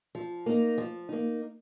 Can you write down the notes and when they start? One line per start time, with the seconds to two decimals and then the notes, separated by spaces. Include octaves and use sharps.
0.15 F3
0.46 A#3 D#4
0.78 F3
1.09 A#3 D#4